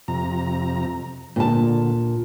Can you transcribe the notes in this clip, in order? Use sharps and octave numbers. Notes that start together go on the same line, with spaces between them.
F2 C3 A#5
D2 A#2 A5